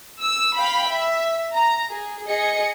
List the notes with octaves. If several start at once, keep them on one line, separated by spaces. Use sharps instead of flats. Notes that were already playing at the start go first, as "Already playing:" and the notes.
E6
F5 G5 B5
E5
A#5
G#4
G#4 D#5 C#7